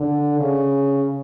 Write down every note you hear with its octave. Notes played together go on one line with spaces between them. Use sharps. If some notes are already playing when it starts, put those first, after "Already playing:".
Already playing: D3
C#3